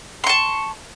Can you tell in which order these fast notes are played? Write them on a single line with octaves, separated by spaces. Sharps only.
C6 C#6 A5